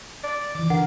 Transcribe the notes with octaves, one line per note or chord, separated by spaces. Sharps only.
D5
D#3 E3 D6
D3 A#4 F#5